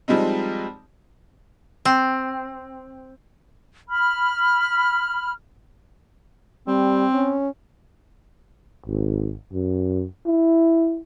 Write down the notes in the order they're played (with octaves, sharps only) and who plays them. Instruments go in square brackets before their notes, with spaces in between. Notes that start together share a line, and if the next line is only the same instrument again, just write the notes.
[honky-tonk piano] F3 G3 G#3 C4 D#4
[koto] C4
[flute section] B5 F6
[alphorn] G3 [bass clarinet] C4
[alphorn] C#4
[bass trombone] G#1
F#2
E4